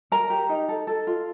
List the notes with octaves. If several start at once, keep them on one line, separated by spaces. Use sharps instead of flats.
A#4 A#5
G4
D#4
A4
A4
F4